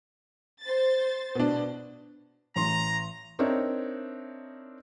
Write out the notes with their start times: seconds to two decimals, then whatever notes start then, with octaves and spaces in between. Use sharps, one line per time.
0.61 C5 A6
1.35 B2 D4
2.56 A1 A#5 C6
3.39 C4 D4 D#4 A#4 C#5 E5